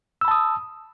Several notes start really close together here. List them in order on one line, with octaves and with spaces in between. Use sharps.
E6 B5 A5 D#6